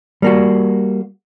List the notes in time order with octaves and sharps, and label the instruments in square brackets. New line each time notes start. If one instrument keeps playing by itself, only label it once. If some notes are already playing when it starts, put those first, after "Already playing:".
[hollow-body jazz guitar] G3 A#3 F#4